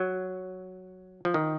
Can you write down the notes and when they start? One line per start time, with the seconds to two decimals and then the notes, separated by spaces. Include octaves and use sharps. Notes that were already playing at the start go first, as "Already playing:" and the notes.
Already playing: F#3
1.25 F3
1.34 D#3